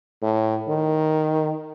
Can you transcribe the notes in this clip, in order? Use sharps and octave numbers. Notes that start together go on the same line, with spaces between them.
A2
D#3